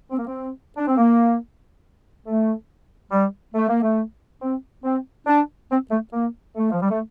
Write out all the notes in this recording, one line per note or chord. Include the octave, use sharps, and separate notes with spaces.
C4
A#3
C4
D4
C4
A#3
A3
G3
A3
A#3
A3
C4
C4
D4
C4
A3
A#3
A3
F3
G3
A3